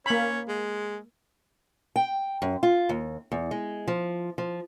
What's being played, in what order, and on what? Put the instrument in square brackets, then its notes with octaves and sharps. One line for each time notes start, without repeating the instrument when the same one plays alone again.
[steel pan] A#3 B5 [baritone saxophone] C#4
[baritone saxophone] G#3
[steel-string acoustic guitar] G5
F#2
F4
D#2
E2
G#3
F3
F3